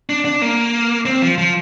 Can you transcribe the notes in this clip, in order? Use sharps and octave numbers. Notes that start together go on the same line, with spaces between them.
D4
D4
A#3
C4
F3
F3